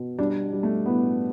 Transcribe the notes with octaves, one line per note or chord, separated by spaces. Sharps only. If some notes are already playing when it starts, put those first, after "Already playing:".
Already playing: B2
G3 D4
G3
A3
A2 B3